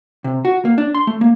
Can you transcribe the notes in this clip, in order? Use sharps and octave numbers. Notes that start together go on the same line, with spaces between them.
C3
F#4
A#3
D4
C6
A3
A#3